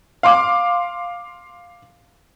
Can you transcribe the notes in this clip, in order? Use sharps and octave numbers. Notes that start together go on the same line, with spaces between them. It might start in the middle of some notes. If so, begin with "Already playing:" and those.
F5 C6 D6